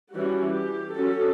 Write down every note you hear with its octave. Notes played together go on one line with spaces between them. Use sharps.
E3 G3 C#4 F#4
G4
F#3 C#4 A4